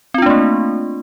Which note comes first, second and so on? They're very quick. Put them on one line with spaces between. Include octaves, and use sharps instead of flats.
C4 F4 D4 A3 A#3